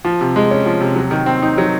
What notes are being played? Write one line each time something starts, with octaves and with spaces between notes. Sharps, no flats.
F3
C3
G#3
C#4
F3
C3
F#3
D#3
C4
D#4
F#3